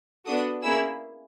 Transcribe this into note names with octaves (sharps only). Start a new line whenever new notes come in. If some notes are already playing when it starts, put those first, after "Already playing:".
B3 D4 F#4 A4 D#6
A#3 C#4 E4 G#4 E6